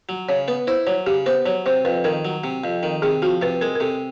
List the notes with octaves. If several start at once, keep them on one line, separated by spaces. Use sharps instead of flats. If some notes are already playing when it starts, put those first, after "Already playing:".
F#3
C#3 C#5
B3 B4
E4 C5
F#3 C#5
C#3 G4
B3 C5
F#3 C#5
C3 C5
F2 B4
D#3 A#4
F#3
C3
F2
D#3
C3 G#4
F3 F#4
C3 B4
G#3 A#4
A#4
C3 A4